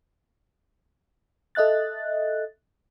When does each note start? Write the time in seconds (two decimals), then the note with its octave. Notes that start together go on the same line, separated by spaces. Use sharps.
1.55 A4 D#5 E5 F#6 A6